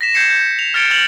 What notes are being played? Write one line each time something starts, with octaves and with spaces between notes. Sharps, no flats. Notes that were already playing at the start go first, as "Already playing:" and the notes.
A#6 B6 E7
G6 G#6 C7 C#7 E7
G6
F7
F6 G#6 A6 C#7 D7 G7
F6 A6 F7 F#7